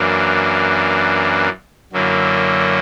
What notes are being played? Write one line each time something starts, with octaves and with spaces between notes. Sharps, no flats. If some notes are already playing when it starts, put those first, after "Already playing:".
Already playing: F#2 E3 A#3 D4
F#2 D3 F#3 A#3 E4